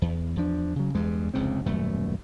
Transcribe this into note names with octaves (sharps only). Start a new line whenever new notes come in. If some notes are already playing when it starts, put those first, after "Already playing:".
E2
E2 F3 D4
C#3 F#3
E2 G2 G#3
F1 C#2 C#3 C4
D#1 F#2 B2 A3